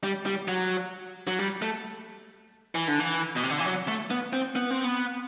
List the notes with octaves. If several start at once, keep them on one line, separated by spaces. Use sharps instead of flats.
G3
G3
F#3
F#3
G3
A3
E3
D3
E3
B2
C3
D3
E3
F#3
A3
B3
C4
B3
C4
B3